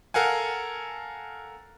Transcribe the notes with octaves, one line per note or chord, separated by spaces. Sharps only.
A4 A#4 F5 F#5 G#5